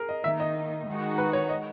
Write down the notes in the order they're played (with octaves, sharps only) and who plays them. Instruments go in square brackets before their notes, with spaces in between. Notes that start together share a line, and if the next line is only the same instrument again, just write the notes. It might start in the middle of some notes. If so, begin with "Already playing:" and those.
Already playing: [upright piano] G#4 A#4
D#5
[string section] D#3 A#3 D#4 [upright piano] E5
[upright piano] D#5
[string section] D#3 G#3 D#4 F#4
[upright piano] B4
C#5
D#5